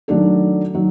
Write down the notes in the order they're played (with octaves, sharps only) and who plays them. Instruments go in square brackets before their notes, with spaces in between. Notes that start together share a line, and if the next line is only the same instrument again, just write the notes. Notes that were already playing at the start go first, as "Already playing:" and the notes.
[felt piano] D#3 F#3 A3 D4 A4
D#3 F#3